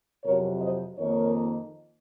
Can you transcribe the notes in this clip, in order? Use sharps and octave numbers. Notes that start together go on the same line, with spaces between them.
F2 C3 F#3 A#4 C#5
C5 D#5
F2 D#3 A#3 D#4 A#4 C#5